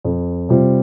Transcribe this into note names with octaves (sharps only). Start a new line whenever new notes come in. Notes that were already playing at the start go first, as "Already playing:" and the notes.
F2
C3 G3 C4 F4